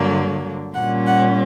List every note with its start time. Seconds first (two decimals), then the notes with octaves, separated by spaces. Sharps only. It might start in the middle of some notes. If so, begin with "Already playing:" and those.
Already playing: G2 D3 F#3 A#3
0.74 A#2 G3 C#4 F#5
1.06 F#5